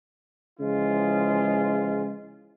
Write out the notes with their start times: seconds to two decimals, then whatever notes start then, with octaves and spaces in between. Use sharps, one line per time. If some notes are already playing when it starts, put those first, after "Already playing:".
0.60 C#3 E3 F3 G#3 F4